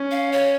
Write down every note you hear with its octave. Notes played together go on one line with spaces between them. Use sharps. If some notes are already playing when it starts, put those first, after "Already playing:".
Already playing: C#4
F5
C#5